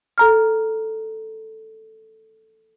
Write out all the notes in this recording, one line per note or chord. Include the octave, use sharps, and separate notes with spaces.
A4 A#5 F6